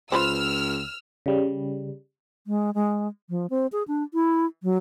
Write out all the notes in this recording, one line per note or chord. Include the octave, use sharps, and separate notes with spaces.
C#2 F4 B4 C5 E6 F6
C#3 G3
G#3
G#3
F3
C4
G#4
D4
E4
F#3